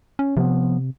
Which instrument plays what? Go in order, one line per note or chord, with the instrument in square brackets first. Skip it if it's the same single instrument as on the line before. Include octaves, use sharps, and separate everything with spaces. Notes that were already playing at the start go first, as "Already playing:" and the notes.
[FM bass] C#4
[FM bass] C3 [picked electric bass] F3 B3